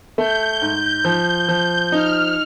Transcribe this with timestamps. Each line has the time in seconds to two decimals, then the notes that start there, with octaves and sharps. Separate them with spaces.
0.18 A3 G6
0.62 G#2
1.04 F3
1.48 F3
1.92 D#4 F6